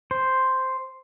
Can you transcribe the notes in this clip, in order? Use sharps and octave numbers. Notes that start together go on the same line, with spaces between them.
C5